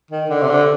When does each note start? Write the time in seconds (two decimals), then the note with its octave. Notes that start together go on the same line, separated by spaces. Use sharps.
0.11 D#3
0.30 D3
0.42 C3
0.50 D3